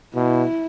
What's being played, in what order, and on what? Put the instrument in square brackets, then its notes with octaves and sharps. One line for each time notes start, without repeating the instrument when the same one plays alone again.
[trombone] B2 [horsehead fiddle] E4